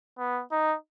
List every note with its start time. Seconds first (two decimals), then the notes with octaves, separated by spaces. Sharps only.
0.18 B3
0.52 D#4